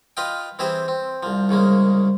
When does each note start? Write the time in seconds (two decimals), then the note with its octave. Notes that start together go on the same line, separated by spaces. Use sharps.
0.17 F4 B4 D#5 F5 G5
0.59 E3 C4 E4 G4 G#4 C5
0.88 C4
1.23 C2 F3
1.49 C2 C#3 G#3 A#3